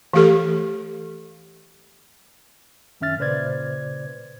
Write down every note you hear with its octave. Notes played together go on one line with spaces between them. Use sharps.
E3 A3 G4 A4
F#2 D#3 C#4 E5 F6 A6
A#2 C#3 B4 C5 D5 G#6